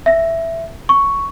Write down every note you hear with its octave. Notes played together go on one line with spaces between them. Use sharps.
E5 A#6
C#6